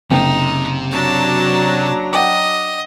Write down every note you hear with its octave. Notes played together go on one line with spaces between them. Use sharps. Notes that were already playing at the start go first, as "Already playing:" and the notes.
F#1 C3 D#4 G5
F#3 D4 A5 A#5
D#5 F#5 G5 D6